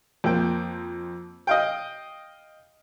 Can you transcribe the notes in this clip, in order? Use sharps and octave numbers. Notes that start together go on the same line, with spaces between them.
F2 A#3 G5
D#5 F5 G5